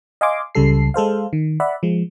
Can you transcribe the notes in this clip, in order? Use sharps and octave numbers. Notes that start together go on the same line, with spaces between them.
D#5 F5 G#5 C6 D6
C#2 C#3 G3 A4 C7
G#3 A4 C5 F5
D#3
D5 E5 F#5 B5
F3 G#3